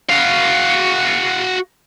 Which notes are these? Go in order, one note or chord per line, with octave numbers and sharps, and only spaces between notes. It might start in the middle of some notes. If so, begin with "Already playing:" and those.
F#4 F5